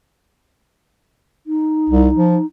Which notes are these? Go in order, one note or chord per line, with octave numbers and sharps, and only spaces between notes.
D#4
C2
F3